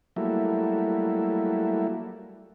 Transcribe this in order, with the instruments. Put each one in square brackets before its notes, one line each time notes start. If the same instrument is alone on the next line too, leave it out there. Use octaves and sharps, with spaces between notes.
[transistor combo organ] F#3 G3 A3 A#3 E4